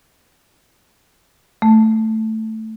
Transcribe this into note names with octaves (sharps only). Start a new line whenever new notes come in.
A3